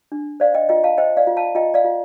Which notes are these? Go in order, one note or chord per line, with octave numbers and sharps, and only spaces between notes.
D4
C5 D5 F5
D#5 G5
F4 D#5 G5
F5 A5
C5 D#5 G5
D5 F5
F4
F5 A5
F4 D#5 G5
D5 F5
F4